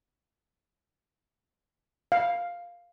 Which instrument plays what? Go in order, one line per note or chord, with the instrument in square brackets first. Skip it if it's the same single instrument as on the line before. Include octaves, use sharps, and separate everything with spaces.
[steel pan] F5